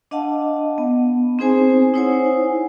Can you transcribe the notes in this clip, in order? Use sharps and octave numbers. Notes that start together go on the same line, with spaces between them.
D4 D#5 F5 F#5 A5
B3
C4 D#4 G#4 C5 G#5
D#4 E4 C5 C#5 F#5 G#5